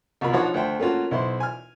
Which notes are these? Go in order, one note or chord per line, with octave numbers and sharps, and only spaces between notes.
C2 B2 F4 A#4 B5
F3 D4 D#4 F4 F#4 C#5
D2 C5 E5 G5
A3 A#3 C#4 F4 F#4
B1 E4 C5 C6
G#5 F6